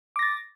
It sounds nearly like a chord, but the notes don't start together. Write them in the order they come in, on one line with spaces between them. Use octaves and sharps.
D6 A#6 A6